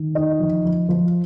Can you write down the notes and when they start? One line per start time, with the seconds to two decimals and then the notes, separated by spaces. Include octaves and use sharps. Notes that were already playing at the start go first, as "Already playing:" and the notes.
Already playing: D#3
0.15 D#4 D#5
0.40 F3
0.65 F3
0.89 F3